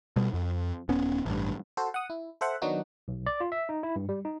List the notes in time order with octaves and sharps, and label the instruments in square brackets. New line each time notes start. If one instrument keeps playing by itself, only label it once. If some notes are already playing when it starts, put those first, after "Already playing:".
[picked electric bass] B2 G3
F2
D#1 B3 C#4
A1 G2
[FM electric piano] F#4 A4 C5
F#5 D#6
E4
A4 C5 E5 F#5
D#3 F#3 B3 D4 D#4 F#4
[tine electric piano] B1
D5
F4
E5
D#4
E4
G2
G3
D#4